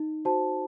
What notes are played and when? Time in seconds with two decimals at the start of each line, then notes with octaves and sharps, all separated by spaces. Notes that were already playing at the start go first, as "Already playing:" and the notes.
Already playing: D#4
0.25 F#4 C5 A5